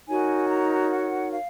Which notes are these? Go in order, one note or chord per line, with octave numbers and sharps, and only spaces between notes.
D#4 F#4 A#4 C#5 G#5
A#5
F#5
F5